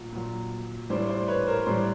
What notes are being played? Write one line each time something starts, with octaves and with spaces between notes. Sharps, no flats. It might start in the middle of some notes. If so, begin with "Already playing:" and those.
Already playing: A#2 F#3
A#2 F#3
A2 E3 G3 C5 D5
C5 D5
B4 C#5
A#4 C5
A2 E3 G3 C5 D5